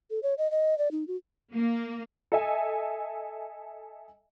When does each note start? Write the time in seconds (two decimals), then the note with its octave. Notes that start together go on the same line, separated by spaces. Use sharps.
0.10 A4
0.23 C#5
0.38 D#5
0.51 D#5
0.78 D5
0.91 D#4
1.08 F#4
1.52 A#3
2.32 A4 D#5 E5 G#5